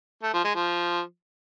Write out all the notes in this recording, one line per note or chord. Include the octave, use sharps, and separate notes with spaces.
A3
F3
G#3
F3